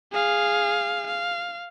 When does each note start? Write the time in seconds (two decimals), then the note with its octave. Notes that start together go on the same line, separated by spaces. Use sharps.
0.13 G#4 F5
1.07 F5